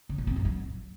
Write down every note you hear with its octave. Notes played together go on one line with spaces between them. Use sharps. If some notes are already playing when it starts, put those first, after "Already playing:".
C#3
A#2
C4
F#2
F#3